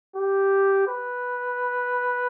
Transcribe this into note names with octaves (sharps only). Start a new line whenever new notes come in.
G4
B4